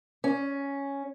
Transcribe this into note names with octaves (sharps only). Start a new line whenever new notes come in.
C#4